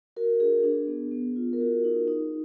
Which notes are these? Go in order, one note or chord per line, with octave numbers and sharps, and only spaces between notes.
F#4 A#4
D4 G#4
D4 G#4
B3
B3
F4
A#4
F#4 G#4
D#4
D#4